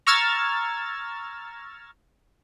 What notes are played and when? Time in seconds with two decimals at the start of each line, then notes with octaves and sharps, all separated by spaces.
0.07 A#5 C#6 E6 F6 G#6 A6